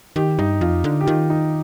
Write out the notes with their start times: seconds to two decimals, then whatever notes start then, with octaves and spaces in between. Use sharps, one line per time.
0.16 D#3 G4
0.39 G2 D#4
0.61 F2 F4
0.84 D3
1.01 G4
1.06 D#3 F4
1.30 D#4